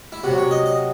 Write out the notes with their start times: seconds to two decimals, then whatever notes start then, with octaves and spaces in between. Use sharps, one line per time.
0.12 E4
0.23 C3 F#3 F#4
0.38 C#5
0.51 D#5
0.66 D#5